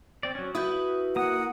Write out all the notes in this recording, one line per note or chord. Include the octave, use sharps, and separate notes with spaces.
C4 D5
F#3 C#4
E4 F#4 B4 D#6 G6
A#3 F#5 D#6